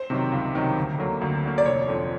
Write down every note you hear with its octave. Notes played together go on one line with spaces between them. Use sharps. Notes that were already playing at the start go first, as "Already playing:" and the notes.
Already playing: C5
C3 D#3 F#3
C#2
C3 D#3 F#3
D2
D3 F#3 A#3
D2
D3 F#3 A#3
D5
F1 C#5
F2 D3 F3